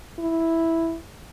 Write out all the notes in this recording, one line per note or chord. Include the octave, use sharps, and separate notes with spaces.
E4